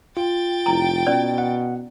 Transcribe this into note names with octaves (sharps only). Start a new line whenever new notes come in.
F4 G5 A6
F1 E4 A#5
B2 C#4 D5
F#5